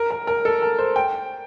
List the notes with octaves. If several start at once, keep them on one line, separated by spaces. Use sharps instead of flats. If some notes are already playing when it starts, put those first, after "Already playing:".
Already playing: A#4
A#4
A#4
A4
A#4
C5
G5